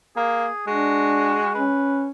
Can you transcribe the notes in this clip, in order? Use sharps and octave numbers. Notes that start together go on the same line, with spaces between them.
A#3 G#4
G#3 D4 F#4
C#4 B4